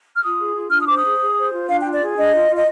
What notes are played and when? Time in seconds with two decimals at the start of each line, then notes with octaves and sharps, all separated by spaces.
0.14 F6
0.22 F4 D#6
0.39 G#4
0.55 F4
0.71 D4 F6
0.79 D#6
0.87 C5 D6
0.97 D#6
1.04 G#4
1.19 G#4
1.36 C5
1.52 F4
1.68 D4 F5
1.80 G5
1.85 F4
1.92 D5
2.01 G#4
2.17 D4 D#5
2.34 F4
2.49 F4
2.55 D#5